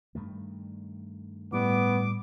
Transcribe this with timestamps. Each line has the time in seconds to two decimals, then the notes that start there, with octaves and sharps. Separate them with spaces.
0.15 G2 D#3 A3
1.52 A2 G3 B3 D6